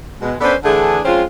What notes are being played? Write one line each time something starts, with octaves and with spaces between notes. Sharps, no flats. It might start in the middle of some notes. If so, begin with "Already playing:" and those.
B2 G#3
B3 C#4 D4 A4 B4 C5
D3 E3 A3 D4 G#4
F3 G#3 C4 C#4 F4